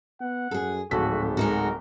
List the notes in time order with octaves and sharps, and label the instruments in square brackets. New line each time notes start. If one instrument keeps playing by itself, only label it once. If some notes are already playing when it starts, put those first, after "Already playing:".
[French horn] B3 [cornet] F#5
[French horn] F#2 [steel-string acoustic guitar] G#4 A4
[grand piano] D1 A4 B6 [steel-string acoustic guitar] F2 [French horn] G#2 [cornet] F#4
[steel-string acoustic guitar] G#3 D#4 F#4 [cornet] A#4